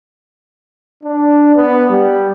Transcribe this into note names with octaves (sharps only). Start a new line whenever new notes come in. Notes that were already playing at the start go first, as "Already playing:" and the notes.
D4
B3
G3